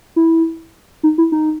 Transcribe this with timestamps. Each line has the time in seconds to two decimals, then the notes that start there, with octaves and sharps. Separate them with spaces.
0.16 E4
1.03 D#4
1.18 E4
1.32 D#4